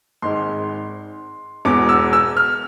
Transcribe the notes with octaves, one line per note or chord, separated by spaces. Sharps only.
G#1 G#2 G#3 C6
E1 E2 B2 D6
E6
E6
F6